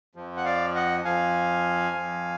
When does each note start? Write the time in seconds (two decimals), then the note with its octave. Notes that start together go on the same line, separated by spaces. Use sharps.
0.15 F2 F3
0.37 F#5
0.45 D5 F5
0.75 D#5 F#5
1.05 F2 F3 F5 G#5
1.96 F2 F3